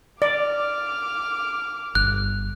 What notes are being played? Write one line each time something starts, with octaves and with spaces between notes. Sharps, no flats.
D5 D6 F6
G1 F#6